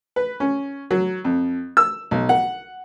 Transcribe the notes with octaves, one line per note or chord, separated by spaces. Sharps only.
B4
C#4
F#3
F2
E6
B1
F#5